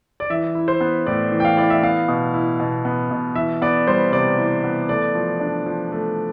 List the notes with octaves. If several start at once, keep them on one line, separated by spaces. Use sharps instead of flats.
D5
E3 E5
E4
C5
B3
A2 D5
E3
G5
F5
E4 D5
E5
B3 F5
B2
E4
B2
B3
B2
E3 E5
B3 D5
G3 C5
C3 D5
E3
B3
A3 D5
F3
D4
F3
A3